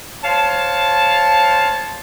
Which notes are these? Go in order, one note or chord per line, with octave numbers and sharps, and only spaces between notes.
C5 C#5 F5 A5